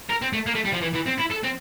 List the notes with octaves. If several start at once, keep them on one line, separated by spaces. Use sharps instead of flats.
A#4
C4
A3
A#3
A3
G3
F3
E3
E3
C4
E4
A4
C4